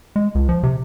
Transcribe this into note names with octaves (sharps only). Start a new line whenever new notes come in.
G#3
C#2
F3
C3